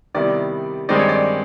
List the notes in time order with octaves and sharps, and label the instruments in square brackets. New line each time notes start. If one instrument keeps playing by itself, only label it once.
[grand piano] C3 D#3 G3 B3 E4 D5
G2 D#3 G#3 C4 D#4 D5
C#5
D5